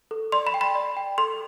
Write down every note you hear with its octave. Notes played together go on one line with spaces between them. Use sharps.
A4
D5 C6
B5
G5
B5
D5
G5
A4 C6